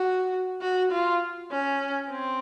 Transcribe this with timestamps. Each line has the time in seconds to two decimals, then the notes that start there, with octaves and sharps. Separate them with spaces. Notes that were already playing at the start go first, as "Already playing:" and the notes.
Already playing: F#4
0.61 F#4
0.92 F4
1.51 C#4
2.10 C4